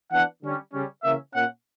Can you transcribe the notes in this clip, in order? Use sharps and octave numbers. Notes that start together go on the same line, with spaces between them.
E3 B3 D4 F#5
D3 G3 C#4
C#3 G3 C#4
C#3 E3 A#3 C#4 E5
A#2 A#3 C#4 F#5